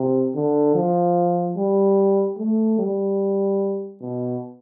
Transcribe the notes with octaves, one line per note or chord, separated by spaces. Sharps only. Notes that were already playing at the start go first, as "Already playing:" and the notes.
Already playing: C3
D3
F3
G3
A3
G3
B2